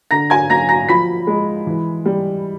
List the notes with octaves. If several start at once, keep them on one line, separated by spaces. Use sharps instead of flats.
D3 A#5 A#6
G#5 G#6
F#3 A#5 A#6
A#5 A#6
F3 B5 B6
G#3
E3
G3